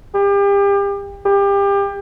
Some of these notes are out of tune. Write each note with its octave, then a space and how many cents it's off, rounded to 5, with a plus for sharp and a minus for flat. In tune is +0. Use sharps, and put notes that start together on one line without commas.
G4 +35
G4 +30